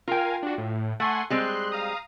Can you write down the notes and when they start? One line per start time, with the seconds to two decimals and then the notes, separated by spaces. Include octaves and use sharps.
0.08 F4 A#4 F5 G5 G#5
0.43 D4 F#4
0.58 A2
1.00 A3 F#5 G#5 C6
1.30 G3 G#3 C4 C6 F#6
1.72 F5 A#5 D#6